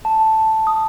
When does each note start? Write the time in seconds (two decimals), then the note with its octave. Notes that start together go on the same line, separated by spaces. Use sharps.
0.05 A5
0.67 D#6